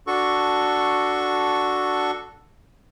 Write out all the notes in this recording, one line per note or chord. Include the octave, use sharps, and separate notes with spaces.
D4 F#4 A4 C#6